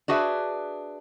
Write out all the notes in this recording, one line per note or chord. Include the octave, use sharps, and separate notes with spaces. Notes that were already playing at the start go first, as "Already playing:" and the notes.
D4 F#4 G#4 B4 E5